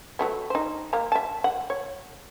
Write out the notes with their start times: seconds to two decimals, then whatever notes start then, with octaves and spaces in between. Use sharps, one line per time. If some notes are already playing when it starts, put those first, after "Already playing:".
0.19 F#3 A3 B3
0.50 D#4 C5
0.93 A#3 A#5
1.12 E5 A5
1.44 F#5
1.70 C#5